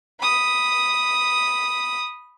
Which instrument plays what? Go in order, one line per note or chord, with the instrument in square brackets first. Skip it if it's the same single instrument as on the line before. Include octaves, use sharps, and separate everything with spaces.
[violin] B5 D#6